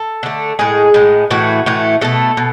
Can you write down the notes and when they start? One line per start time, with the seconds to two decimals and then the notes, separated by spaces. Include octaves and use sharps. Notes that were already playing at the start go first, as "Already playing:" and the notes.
Already playing: A4
0.23 D3 A3
0.59 A2 G#3 G#4
0.94 A2 G#3
1.30 A2 E3 A3 F#4
1.66 A2 E3 A3
2.01 B2 A3 A4
2.37 B2